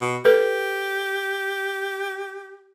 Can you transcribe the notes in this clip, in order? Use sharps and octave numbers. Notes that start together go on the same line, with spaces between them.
B2
G4 A4 B4